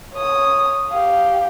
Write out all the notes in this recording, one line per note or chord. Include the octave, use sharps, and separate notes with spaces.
C#5 D#6
G4 F5